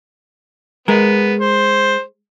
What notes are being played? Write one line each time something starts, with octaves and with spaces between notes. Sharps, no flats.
G#3 B3 A#4
C5